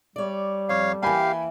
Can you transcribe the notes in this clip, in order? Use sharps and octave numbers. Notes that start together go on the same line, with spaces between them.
G3 C#5 D5
F2 C#5 F5
E3 A#3 G4 F5 G5 G#5 B5